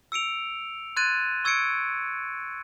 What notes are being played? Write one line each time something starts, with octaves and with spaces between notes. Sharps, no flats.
E6 C#7 D7 F7
C6 F#6 G#6 A6 D#7
C#6 E6 G#6 A6 C#7 D7